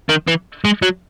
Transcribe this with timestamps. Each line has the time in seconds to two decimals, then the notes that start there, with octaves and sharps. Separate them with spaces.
0.09 D#3
0.28 E3
0.65 G#3
0.83 F#3